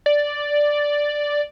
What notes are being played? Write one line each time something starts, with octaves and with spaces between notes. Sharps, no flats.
D5